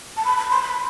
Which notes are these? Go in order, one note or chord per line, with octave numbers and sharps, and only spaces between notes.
A5
B5
B5
C6
B5